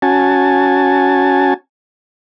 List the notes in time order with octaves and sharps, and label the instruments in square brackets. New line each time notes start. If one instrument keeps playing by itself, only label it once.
[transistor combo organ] C#4 F#4 G#5 A5